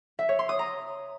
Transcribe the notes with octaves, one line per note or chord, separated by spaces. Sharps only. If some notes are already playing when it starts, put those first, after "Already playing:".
E5
C#5
C6
D#6
A#5